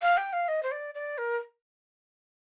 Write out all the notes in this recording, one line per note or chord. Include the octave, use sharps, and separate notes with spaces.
F5
G5
F5
D#5
C5
D5
D5
A#4